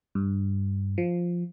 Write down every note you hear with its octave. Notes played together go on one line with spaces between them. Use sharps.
G2
F3